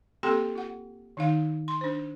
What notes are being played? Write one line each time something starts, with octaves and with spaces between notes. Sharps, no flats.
A#3 C4 G4 A4 G5 C6
F4 F#5
D#3 D#4 F5
C6
D4 C5